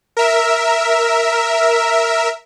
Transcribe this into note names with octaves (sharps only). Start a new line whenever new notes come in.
A#4 E5